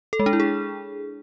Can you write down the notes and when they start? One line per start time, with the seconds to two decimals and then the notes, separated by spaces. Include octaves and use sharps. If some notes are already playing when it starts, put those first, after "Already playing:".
0.13 A4
0.19 G#3
0.26 D4
0.33 E4
0.40 G#4